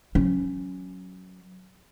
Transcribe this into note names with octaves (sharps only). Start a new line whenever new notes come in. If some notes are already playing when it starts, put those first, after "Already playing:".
F#3 C#4